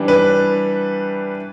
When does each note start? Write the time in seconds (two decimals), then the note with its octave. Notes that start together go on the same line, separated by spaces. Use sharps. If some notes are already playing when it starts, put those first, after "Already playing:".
Already playing: E3 G3 D4
0.08 B4